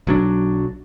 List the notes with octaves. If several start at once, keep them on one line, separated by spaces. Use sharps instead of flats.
B1 F#3 D4